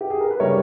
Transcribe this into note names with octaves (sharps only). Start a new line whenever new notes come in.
G4
G#4
A#4
B4
C#3 G3 A#4 C#5